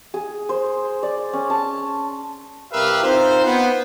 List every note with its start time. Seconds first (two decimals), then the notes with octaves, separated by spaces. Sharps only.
0.14 G#4
0.49 C5
1.03 D5
1.33 C#4
1.50 A5
2.73 C2 G4 A#4 B4 E5 F5
3.03 C4 D#4 F4 C5
3.45 B3